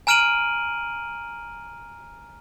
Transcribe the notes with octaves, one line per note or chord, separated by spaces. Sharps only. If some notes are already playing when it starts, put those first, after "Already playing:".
G#5 A#5 F6 D7 D#7 F#7